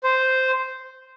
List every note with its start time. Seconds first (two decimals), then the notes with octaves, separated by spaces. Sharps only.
0.04 C5